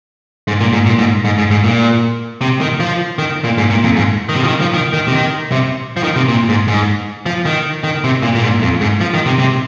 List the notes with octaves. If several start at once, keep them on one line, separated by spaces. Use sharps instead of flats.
G#2
A#2
G#2
A#2
G#2
G#2
G#2
G#2
A#2
C3
D#3
F3
D#3
A#2
G#2
A#2
F2
G#2
D#3
C3
F3
D#3
F3
D#3
D#3
C3
D#3
C3
F3
D#3
C3
A#2
G#2
G#2
F3
D#3
D#3
C3
A#2
A#2
G#2
F2
G#2
F3
D#3
C3
C3